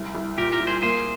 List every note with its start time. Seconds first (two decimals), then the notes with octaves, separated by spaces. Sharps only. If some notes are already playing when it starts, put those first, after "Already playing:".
Already playing: C2
0.15 C2
0.38 A#2 G4 A#4
0.52 G4 A#4
0.60 A#2
0.67 G#4 C5
0.82 A#3 G#4 C5